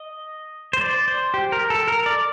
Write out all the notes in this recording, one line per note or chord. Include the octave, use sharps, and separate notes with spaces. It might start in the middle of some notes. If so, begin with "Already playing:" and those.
Already playing: D#5
C5
D5
C5
G4
A#4
A4
A#4
D5